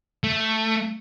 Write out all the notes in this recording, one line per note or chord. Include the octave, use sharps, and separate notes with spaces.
A3